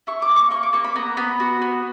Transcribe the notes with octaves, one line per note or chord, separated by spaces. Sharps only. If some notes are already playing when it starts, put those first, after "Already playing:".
E4 C#6
D6
A#3
C#6
A#3 C#6
D6
A#3 C#6
B5
B3 A#5
B3 B5
F#4
B3